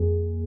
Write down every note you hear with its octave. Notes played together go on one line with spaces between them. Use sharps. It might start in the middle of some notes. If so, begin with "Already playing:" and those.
Already playing: F2 A#3 G#4